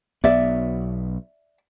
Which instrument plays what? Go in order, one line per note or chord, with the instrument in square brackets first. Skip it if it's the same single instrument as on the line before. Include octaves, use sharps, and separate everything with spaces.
[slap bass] B1 B3 [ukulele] D5 E5